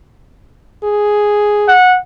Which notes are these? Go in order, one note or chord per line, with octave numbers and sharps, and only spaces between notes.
G#4
F#5